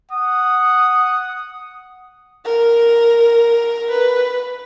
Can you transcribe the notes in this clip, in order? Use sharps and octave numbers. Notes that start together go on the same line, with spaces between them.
F#5 D#6
A#4
B4